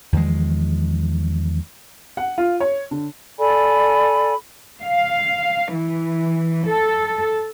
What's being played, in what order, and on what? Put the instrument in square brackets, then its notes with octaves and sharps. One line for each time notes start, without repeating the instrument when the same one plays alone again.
[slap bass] E2 D#3 F3 G#3
[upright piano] F#5
F4
C#5
D3
[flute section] A4 D5 G#5 B5
[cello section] F5
E3
A4